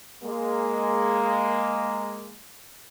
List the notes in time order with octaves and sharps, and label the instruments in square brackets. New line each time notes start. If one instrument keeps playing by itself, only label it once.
[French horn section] G#3 A#3